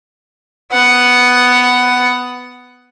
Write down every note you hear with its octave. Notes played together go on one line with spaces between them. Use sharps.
B3 F#5